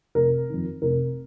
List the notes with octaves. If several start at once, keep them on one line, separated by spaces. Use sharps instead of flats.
F1 A#4
F2 D#3
F1 A#4